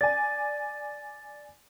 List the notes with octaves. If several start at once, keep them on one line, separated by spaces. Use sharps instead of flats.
D5 G#5 A6